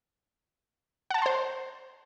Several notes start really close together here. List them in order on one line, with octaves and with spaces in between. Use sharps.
F#5 A5 A#5 C6 C5